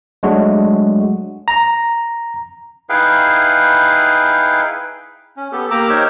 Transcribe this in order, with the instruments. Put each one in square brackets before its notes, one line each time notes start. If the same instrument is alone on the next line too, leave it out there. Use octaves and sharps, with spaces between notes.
[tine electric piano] F#3 G#3 A3 D4 F#4
A#5
[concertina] D#4 E4 G#4 B4 F5 G5
C#4
B3 G4 A4
A#3 G4 A#5 D6 E6
D#4 G4 A#4 C5 C#5